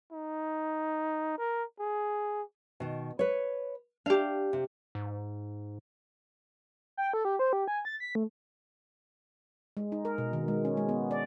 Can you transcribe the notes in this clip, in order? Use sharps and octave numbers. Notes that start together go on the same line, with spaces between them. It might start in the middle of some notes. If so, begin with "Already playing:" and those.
D#4
A#4
G#4
B2 D#3
B4 C#5
D4 G4 F5
C3
G#2
G5
A4
G4
C5
G4
G#5
A6
B6
A3
G#3
D#4
A#4
B2
D#3
G#3
C#4
G#3
B3
D5